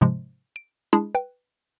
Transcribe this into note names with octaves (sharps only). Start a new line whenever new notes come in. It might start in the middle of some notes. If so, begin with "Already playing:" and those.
G#2 C3 F3 G#3
D7
G#3 D4 E4 G#4
B4 G5